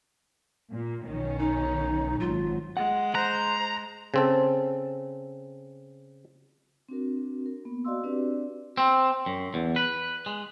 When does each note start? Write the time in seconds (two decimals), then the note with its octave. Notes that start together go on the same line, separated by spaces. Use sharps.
0.71 A#2
1.07 B1 D#3 C#4
1.39 D#4
2.20 G#1 F#3 F4
2.77 G#3 F#5
3.15 C5 A#5 F#6
4.14 C#3 C4 A4
6.89 C4 D4 F#4 A#4
7.46 A#4
7.65 A#3 B3
7.85 F#4 D5 D#5 F5 C6 E6
8.04 C4 D4 F#4 G4 B4 D5
8.77 C4
9.26 F#2
9.54 E2
9.76 B4
10.26 G#3